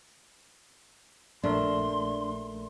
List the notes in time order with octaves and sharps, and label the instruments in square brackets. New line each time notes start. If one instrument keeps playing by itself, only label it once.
[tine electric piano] A#1 A3 A#4 [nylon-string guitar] D4 [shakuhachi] C6